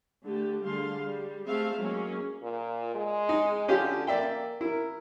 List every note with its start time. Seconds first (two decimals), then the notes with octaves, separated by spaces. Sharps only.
0.24 D3 A3 G4
0.63 D3 G3 G#4 F5 C6
1.02 G3
1.46 A3 C4 G#4 E5 F5
1.77 F#3 G#3 A#3 C#4
2.43 A#2
2.95 G#3
3.29 D#4
3.68 D3 C#4 F4 G4
4.07 A#3 D5 E5 G5
4.61 E4 A#4